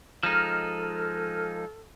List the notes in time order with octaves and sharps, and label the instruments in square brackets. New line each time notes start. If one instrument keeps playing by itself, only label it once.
[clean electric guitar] F3 G#3 D#4 [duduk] A4 [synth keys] F6